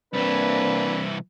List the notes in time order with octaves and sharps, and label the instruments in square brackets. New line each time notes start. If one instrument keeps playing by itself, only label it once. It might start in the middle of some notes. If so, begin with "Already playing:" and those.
[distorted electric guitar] C2 E3 [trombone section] A#3 C4 D4 [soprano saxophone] B4